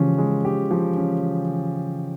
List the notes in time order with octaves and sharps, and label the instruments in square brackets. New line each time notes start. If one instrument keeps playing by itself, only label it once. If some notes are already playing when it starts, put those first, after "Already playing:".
Already playing: [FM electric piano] C#3 E3 [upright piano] F3 G#3 C#4 G4
[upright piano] G#3
G4
F3
C#4